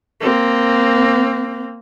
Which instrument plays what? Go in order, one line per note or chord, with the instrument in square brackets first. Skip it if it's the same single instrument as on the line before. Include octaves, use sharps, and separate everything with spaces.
[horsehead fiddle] A#3 C4